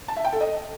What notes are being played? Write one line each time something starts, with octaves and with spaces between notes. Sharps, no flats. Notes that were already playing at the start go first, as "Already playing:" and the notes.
A5
E5
G5
A4
D#5